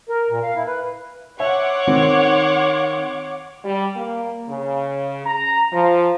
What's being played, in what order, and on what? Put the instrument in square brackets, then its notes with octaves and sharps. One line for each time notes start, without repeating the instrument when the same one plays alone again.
[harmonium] A#4
A#2
F5
E4
B4
[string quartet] C#5 [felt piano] E5 [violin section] F#5 C6 D6
[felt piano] D#3 C4
[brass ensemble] G3
A#3
C#3
A#5
F3